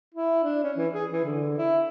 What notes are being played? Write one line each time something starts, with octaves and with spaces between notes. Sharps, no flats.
E4
D4
C#4
E3
G#4
E3
D3
E4